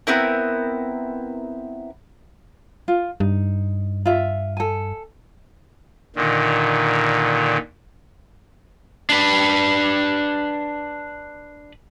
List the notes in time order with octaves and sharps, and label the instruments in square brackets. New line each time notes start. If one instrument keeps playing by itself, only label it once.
[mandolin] B3 C4 E4 A#4
[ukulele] F4
[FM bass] G2 [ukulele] D#4
[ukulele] F4 E5
A4 G#5
[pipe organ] A#2 D3 D#3
[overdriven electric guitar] D4 B4